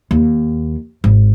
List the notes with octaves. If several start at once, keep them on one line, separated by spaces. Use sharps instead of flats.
D#2
G#1